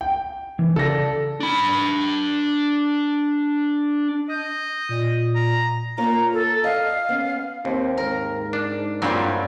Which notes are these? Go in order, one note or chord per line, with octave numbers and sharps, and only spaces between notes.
G5
E3
C#3 A4 D5 A#6
D4 B5
D#5 G6
A#2
A#5
A#3 F4 C#5 A#5
A4
D#5 F5
B3 C#4
D#2 C4
G#2 A#4
D4
G2 A#2 F#3 G3 C4 F5